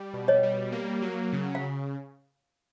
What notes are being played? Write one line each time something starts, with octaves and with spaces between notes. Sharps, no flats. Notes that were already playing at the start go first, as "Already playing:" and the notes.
Already playing: G3
B2
C#5 D#5
G3
A#3
F#3
C#3
F5